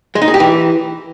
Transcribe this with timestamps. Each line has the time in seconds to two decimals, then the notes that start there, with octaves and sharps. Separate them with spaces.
0.15 G#3
0.22 D#4
0.28 G#4
0.34 G4
0.40 E3